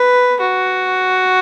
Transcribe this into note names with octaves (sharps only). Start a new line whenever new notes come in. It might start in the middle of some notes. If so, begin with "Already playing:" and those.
Already playing: B4
F#4